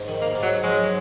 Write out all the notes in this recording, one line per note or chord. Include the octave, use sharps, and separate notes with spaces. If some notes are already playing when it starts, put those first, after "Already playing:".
Already playing: G#2
D#3
A#3
G#2
F#3
F#3 G#3